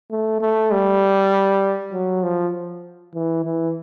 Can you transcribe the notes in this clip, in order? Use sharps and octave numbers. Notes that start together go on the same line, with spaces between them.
A3
A3
G3
F#3
F3
E3
E3